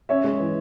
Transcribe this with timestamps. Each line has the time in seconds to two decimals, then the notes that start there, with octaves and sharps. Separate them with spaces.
0.09 C#4 C#5 E5
0.24 G#3
0.40 E3